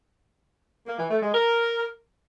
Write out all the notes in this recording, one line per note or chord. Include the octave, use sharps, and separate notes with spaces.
A#3
E3
A3
G#3
A#4